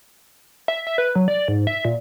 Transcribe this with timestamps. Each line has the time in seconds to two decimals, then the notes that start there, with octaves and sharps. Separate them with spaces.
0.68 E5
0.87 E5
0.98 B4
1.15 F#3
1.28 D5
1.48 G#2
1.67 E5
1.85 A#2